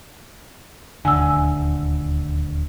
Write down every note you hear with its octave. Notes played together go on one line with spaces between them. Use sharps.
D#1 D2 D3 G#5 E6